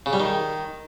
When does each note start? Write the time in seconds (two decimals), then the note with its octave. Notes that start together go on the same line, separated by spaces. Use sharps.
0.06 C#3
0.13 G3
0.20 D#3